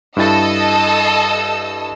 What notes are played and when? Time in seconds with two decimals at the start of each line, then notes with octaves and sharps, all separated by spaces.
0.17 G2 E4 A4 D#5 E6 A6